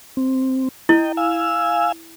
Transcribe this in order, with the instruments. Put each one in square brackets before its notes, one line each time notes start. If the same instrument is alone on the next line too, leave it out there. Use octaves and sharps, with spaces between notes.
[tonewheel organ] C4
[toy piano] E4 [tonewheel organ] D#5 G5
[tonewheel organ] F5 G#5 E6